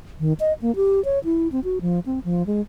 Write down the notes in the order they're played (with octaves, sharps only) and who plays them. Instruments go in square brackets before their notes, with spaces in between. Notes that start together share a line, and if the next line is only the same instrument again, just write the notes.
[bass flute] D#3
D#5
A#3
G4
C#5
E4
C4
F#4
F3
C4
F3
G#3